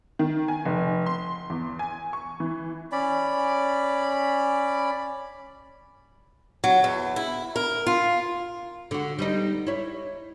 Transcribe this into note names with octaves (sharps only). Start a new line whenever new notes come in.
D#3
G#5
F1
C6
E2
G#5
C#6
E3
C#4 D5 B5
F#3
E2
E4
A#4
F4
D3 F#4
G3 B3 D#4
E4 C#5